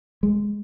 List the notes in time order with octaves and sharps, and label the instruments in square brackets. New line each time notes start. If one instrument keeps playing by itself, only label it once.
[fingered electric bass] G#3